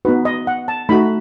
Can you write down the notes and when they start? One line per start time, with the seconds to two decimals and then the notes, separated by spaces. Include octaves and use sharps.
0.05 B3 D#4 F#4 B4
0.25 D#5
0.47 F#5
0.68 A5
0.89 A3 D#4 F#4 B5